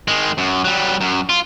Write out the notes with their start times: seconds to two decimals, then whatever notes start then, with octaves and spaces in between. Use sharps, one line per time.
0.08 D#3 G#3
0.38 F#2
0.64 F#3 G3
1.01 F#2
1.29 F4